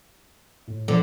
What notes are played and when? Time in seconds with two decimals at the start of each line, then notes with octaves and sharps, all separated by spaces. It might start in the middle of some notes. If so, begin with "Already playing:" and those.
0.68 A2
0.88 D3 F3